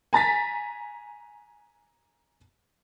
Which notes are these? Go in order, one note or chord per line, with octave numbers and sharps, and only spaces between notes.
G#5 A#5 A6 B6